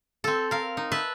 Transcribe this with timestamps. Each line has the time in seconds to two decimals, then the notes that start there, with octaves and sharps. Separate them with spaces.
0.24 C4 A4
0.51 A#4 F5
0.77 D#4
0.92 B4 E5 A5